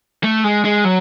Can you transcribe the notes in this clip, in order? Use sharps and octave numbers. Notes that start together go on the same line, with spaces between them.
A3
G#3
G#3
F#3